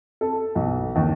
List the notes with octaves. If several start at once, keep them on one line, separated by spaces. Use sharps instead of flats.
A4
B1
D#2